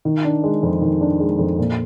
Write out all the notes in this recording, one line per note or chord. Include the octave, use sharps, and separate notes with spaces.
D#3
D4
G#3
F2
D#3
D4
G#3
F2
A#2